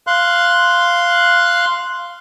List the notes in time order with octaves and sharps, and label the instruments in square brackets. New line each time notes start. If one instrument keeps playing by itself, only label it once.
[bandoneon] F5 C6 F#6